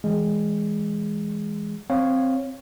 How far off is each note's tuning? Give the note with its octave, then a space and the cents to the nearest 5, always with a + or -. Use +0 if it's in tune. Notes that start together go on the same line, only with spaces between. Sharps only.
E3 +0 G#3 +0
C4 +0 C#5 +0 F5 +0